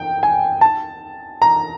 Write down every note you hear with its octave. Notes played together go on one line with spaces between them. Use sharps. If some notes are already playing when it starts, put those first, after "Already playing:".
Already playing: G5
G#5
A5
A#5